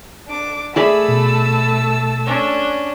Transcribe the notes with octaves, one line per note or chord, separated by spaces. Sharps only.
D4 D6
A3 G#4 D5 E5 A5 B5 E6
B2
C#4 D4